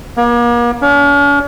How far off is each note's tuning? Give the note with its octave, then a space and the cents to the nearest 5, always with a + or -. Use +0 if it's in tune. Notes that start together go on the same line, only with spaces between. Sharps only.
A#3 +40
C#4 +45